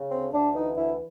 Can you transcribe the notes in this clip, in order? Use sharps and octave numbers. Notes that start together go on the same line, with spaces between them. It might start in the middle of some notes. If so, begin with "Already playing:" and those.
Already playing: C#3
D2 C4
D2 D4
E3 D#4
D2 E4